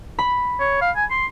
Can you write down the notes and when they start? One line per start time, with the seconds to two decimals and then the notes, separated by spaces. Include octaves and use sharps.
0.19 B5
0.60 C#5
0.82 F5
0.96 G#5
1.11 C6